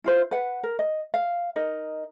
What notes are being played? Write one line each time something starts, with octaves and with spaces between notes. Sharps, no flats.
E4 F4 C5
B4 F#5
A#4
D#5
F5
D#4 A#4 D#5